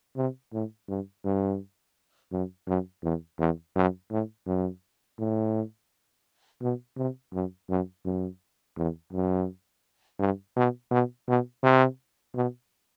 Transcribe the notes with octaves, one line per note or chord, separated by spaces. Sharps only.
C3
A2
G2
G2
F#2
F#2
E2
E2
F#2
A2
F#2
A2
B2
C3
F#2
F#2
F#2
E2
F#2
G2
B2
B2
B2
C3
B2